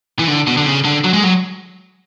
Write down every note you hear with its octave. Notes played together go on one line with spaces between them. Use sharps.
E3
D3
B2
D3
C#3
D3
F#3
G#3
F#3